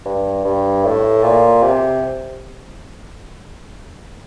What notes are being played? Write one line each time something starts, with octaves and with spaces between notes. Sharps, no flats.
G2
G2
A2
A#2
C3